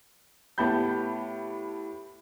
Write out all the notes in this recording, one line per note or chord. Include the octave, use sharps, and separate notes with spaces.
A2 B3 G4 A5 B5 G6